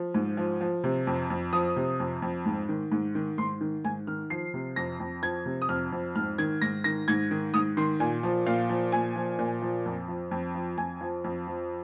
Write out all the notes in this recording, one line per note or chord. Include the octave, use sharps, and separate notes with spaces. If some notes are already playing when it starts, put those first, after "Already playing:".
Already playing: F3
G#2
F3
F3
C3
F2
F2
F3 D#6
C3
F2
F2
G#2
D#3
G#2
D#3
G#2 C6
D#3
G#2 G#5
D#3 F6
F3 C7
C3
F2 A#6
F2
F3 G#6
C3
D#6
F2 F6
F2
G#2 F6
D#3 G#6
G#2 A#6
D#3 A#6
G#2 G#6
D#3
G#2 D#6
D#3 C6
A#2 G#5
F3
A#2 F5
F3
A#2 G#5
F3
A#2
F3
F2
F3
F2
F3
F2 G#5
F3
F2
F3